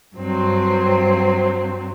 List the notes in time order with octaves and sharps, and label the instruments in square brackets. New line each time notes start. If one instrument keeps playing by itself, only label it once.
[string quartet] G2 F#3 C4